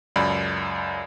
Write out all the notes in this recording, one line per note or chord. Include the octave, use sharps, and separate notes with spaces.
C#2 F#2 D5 B5